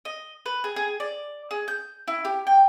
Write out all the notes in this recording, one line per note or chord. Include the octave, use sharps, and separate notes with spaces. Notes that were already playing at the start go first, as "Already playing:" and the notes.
D#5
B4
G#4
G#4
D5
G#4
G6
E4
G4
G5